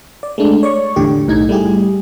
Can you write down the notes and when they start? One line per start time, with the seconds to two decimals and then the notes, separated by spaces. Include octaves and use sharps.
0.23 D5
0.38 G#3 A3 D4
0.63 C#5 D5 C#6
0.96 E2 A2 D3 G4
1.27 B1 A2 D#4 G#6
1.49 G3 A3 E4 G4 G#4